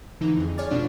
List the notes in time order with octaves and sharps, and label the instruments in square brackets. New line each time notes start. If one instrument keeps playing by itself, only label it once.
[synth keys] D3 E3 D#4
F2 G#4
C#5 D5 G#5 D6 F6 A6
B2 D4 F4